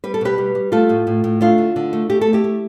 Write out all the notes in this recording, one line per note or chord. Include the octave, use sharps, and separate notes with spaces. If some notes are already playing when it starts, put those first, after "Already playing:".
G3 B4
A4
B2 G4 B4
G3
G3
A3 F4 A4
A2
A2
A2
A3 D4 F4
D3
D3
A3
A3 G4
A4
A3
E4 G4
A3